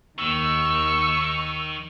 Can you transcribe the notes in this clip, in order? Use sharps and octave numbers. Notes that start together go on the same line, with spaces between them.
D#2 D#3 C#6 E6